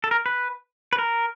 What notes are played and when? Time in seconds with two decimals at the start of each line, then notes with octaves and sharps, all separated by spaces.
0.04 A4
0.11 A#4
0.26 B4
0.93 B4
0.99 A#4